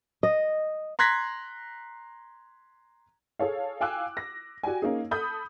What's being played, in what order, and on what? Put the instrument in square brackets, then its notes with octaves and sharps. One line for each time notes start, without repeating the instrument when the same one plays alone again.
[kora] D#5
[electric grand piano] A#5 C6 F#6 G#6 A#6 B6
[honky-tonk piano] G#4 A4 C#5 F5
F5 G5 G#5 D6 E6 F#6
A#6
F#4 G4 D5 G5 G#5
A#3 C#4 D#4 G#4
A4 B5 D#6 G6